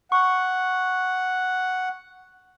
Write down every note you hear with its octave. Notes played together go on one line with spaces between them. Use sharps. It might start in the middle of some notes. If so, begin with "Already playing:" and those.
F#5 C#6